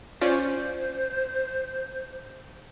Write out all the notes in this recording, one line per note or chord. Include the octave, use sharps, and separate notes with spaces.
C#4 F4 C5 D5